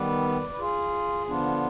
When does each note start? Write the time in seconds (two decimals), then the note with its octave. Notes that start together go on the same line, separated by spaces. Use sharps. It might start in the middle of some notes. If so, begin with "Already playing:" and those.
Already playing: D#3 G3 B3 B4 D5
0.49 B4
0.59 F4 G#4
1.27 D3 F3 B3 D4 F4